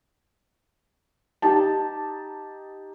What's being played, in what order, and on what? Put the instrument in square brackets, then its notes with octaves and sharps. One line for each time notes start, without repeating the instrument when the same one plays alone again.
[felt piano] D#4 G4 A5